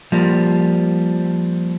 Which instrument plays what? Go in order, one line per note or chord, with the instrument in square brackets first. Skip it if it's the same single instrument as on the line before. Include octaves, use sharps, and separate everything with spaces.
[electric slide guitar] F3 G3 A#3